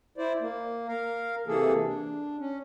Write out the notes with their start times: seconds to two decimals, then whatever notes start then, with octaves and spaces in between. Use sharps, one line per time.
0.18 E4 C5 D5
0.41 A#3
0.88 A#4 F5
1.47 C3 E3 A#3 G#4 A4
1.86 D4
2.39 C#4